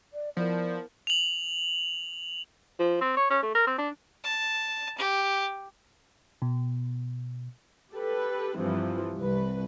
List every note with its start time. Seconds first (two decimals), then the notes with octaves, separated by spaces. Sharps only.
0.13 D5
0.37 F3 B3 E4 A#4 D5
1.07 F7 F#7
2.79 F3
3.01 C4
3.17 C#5
3.30 C#4
3.42 A3
3.55 A#4
3.67 C4
3.78 D4
4.24 A5
4.98 G4
6.42 B2
7.92 G4 A4 B4
8.58 G2 C3 E3 F3
9.20 C2 B4